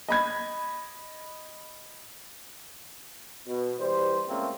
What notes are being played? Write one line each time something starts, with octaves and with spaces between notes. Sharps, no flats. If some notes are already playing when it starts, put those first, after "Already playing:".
D#5 B5 G#6
B2
E3 G3 C5
C#2 C#3 A3 A#3 C4